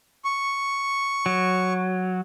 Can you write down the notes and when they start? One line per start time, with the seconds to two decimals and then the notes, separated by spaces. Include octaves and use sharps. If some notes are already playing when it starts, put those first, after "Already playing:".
0.25 C#6
1.26 F#3